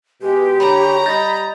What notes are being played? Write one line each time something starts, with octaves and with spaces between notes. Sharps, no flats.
B2 G#3 G4
D3 C#5 A#5 B5
G3 D#4 B5 G6 A6 A#6